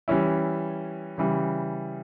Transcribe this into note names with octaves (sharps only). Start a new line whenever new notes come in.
E3 G3 C#4 E4
C#3 E3 G3